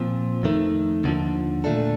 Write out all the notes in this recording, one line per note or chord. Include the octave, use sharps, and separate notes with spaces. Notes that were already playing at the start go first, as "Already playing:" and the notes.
Already playing: A#2 F3 C4
F2 D#3 A3
D#2 D3 F3
A#2 A3 D4 A4